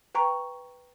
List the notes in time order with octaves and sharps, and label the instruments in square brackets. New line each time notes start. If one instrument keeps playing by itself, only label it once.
[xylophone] B4 G5 A#5 C#6